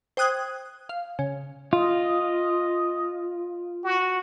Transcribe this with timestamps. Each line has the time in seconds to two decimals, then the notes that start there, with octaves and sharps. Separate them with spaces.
0.17 C5 G5 D#6 F#6 G#6
0.89 F5
1.19 C#3
1.73 F4 D#5
3.85 F#4